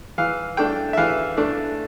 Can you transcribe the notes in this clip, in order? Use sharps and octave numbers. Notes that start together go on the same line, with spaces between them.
E3 F5
A3 D4 G5
E5
E3 F5
A3 D4